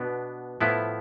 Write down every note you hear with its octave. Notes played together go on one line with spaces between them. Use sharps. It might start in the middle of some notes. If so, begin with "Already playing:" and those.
Already playing: B2 B3 D4
A2 F3 B3 E4